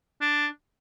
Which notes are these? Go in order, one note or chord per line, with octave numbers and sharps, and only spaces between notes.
D4